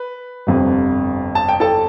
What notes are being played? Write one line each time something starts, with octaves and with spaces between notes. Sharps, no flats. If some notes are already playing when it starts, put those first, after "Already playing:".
Already playing: B4
G1 F2 C3
A5
G5
A4 A5